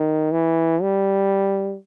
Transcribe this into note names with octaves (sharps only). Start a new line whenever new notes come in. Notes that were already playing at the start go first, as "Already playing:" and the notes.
Already playing: D#3
E3
G3